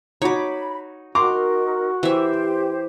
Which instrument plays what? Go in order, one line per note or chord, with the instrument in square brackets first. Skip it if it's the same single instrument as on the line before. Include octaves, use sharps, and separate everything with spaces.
[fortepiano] D#4 F#4 [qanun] C#5 D6 [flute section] B5
[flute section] D#4 A#4 [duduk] F#4 [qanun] A#5 [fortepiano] C6 D6
[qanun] E3 E5 [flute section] G4 C5